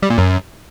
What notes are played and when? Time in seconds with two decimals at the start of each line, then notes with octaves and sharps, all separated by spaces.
0.03 G3
0.10 A#2
0.18 F#2